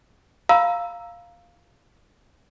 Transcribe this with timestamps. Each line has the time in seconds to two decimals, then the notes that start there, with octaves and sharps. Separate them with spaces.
0.49 F5 A#5 B5 E6